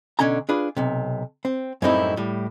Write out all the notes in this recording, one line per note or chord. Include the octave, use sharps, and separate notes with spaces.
B2 D3 C#4 G#5 A#5
D4 F4 G#4 B4
B1 C3
C4
F#2 A2 G3 C4 D#4 E4
A2 G3